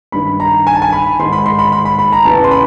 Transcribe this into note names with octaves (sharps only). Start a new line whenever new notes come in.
G2 D#3 B5
A#5
G#5
A5
G#5
B5
G#2 D#3 C6
B5
C6
B5
B5
B5
B5
A#5
E2 C#3 E3 A5
C6
B5